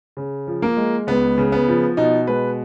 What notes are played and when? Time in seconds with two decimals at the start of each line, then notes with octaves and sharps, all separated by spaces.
0.17 C#3
0.47 F3
0.62 A#3
0.77 G#3
1.07 C#2 B3
1.38 C#3
1.52 B3
1.68 F3
1.97 B2 D#4
2.27 G#3 B4